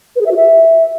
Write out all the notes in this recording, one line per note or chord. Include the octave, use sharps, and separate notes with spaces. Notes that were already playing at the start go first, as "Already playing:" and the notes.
B4
G#4
E5
F#4
E5